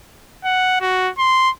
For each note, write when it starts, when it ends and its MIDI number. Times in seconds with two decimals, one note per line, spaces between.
0.45 0.78 78
0.81 1.10 66
1.19 1.50 84